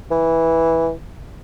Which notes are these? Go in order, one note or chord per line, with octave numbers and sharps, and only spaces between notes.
E3